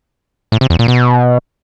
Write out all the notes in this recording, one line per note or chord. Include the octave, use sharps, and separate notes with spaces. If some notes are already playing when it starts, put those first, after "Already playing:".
A2
C3
E2
A#2
B2